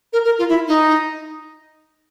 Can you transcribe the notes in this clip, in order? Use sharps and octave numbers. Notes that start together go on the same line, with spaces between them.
A#4
A#4
F4
E4
D#4